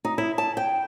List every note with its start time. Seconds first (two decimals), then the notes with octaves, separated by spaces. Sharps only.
0.05 D#4
0.18 E4
0.38 A5
0.57 G5